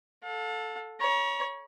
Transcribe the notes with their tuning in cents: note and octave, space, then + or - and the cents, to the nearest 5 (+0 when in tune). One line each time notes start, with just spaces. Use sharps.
A4 +0 F5 +45
C#5 +10 A#5 +45